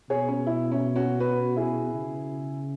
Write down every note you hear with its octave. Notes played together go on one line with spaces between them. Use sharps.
B2 G#4 C#5
C#4
E4
C#4
C#4 F#4
F#4 B4
E4 G#4
C#3